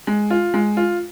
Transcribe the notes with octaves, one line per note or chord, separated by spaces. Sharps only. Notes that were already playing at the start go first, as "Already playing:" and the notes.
G#3
F4
G#3
F4